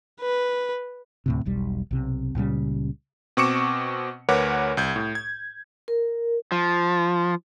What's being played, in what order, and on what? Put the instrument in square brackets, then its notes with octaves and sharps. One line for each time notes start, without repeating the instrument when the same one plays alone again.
[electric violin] B4
[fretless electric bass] D2 A2 C3
E1 B1 G3
B1 C3
C#2 A#2 C#3 G3
[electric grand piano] B2 C4 C#6 D6 C#7 E7
D2 A#4 B4 C#5 F#5 D6
C2 G6 G#6
A2
G#6
[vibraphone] A#4
[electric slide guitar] F3